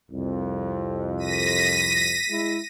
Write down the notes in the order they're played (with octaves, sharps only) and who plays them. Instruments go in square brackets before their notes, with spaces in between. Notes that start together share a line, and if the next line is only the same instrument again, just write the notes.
[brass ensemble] C2 F2
[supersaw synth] A#6 B6 D#7
[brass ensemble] G#3 E4